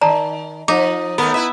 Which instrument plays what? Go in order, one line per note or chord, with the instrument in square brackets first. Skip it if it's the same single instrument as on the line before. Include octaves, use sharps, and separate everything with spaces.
[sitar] D#3 [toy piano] D5 A5 A#5
[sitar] F3 [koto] D#4 [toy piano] D6
[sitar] D#2 A3 A#4 [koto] B3
[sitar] E4 B4 [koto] E5